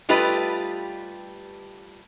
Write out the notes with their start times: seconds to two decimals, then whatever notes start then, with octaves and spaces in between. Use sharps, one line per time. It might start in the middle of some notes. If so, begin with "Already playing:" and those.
0.09 G3 A3 F4 G4 B4 D#5